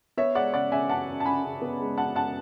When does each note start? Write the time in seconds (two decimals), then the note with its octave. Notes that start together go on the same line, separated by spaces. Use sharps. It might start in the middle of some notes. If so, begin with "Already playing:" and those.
0.17 B3 C#5 E5
0.35 G#3 D5 F#5
0.54 C#3 D5 F#5
0.72 C#3 E5 G#5
0.89 F#2 F#5 A5
1.08 F#2
1.20 A5
1.26 F#2 G#5 B5
1.44 C#3
1.62 B3
1.80 G#3
1.98 F#2 F#5 A5
2.15 F#2 F#5 A5